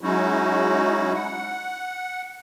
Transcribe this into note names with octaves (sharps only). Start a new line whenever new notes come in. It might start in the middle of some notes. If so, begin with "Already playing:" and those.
F#3 G#3 C#4 D#4 E4 F#4
F#5